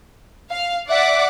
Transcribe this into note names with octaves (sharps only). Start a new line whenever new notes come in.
F5
D5 E5 F#5 D6